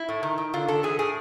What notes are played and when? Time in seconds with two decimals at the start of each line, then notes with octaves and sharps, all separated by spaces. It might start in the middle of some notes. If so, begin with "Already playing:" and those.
Already playing: E4
0.09 A2
0.23 D#3
0.38 D#3
0.54 D3 F4
0.68 D3 A4
0.83 E3 G#4
0.99 A2 G#4